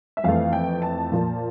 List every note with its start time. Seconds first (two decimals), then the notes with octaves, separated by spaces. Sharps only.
0.17 E5
0.24 F2 E3 A3 F5
0.53 G5
0.82 A5
1.12 A#2 F3 A#3